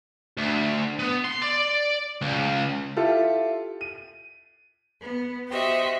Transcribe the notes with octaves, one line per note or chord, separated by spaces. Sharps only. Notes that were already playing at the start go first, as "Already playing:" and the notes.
D2
B3
C6
D5
C#2
E4 F4 G4 A4
D#7
B3
F#4 G4 C5 D#5 E5 G5